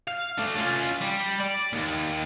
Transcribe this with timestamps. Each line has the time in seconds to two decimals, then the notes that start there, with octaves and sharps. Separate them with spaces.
0.07 F5
0.38 A3 D4
0.56 C#4 F4
1.01 G3
1.40 D5
1.73 D#2